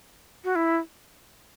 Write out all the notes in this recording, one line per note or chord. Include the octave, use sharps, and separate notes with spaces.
F#4
E4